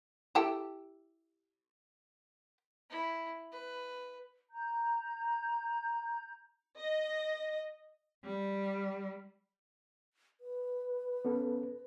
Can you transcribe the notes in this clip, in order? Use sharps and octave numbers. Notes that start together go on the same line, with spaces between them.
E4 G4 A4
E4
B4
A#5 G6
D#5
G3
B4
B3 C#4 A4